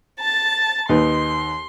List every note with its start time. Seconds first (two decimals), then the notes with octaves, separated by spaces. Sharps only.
0.20 A5 A6
0.89 D#2 D#4 B4 C6